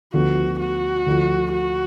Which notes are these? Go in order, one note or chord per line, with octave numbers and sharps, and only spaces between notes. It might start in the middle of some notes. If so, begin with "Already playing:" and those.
D2 D3 F3 B3 F4 F#4
F#4
D2 D3 F3
F#4